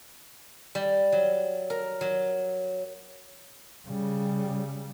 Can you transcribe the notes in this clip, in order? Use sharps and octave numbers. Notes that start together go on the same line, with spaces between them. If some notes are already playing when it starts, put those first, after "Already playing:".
G3
F#3
A#4
F#3
C#3 G3